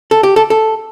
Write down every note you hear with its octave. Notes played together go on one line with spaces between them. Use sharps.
A4
G4
A4
A4